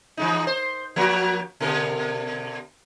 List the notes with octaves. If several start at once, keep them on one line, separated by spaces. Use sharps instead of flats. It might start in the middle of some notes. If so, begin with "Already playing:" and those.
E3 G#3 D#4
C5
F3 A#3 F#4
B2 D3 A#4